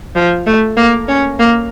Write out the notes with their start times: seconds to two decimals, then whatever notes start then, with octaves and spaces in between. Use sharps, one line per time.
0.15 F3
0.46 A3
0.77 A#3
1.08 C#4
1.39 A#3